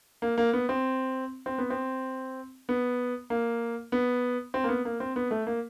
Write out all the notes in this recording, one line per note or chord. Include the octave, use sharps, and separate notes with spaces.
A#3
A#3
B3
C4
C4
B3
C4
B3
A#3
B3
C4
A#3
B3
A#3
C4
B3
A3
A#3